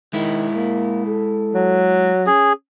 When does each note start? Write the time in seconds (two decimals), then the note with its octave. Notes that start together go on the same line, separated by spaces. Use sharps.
0.13 D#3 G#3 E4
0.55 A#3
1.07 A4
1.54 F#3
2.27 C#4 G#4